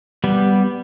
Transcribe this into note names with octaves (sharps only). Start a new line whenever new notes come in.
G3 B3